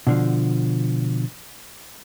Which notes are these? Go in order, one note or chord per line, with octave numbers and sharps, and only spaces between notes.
B2 D3 F3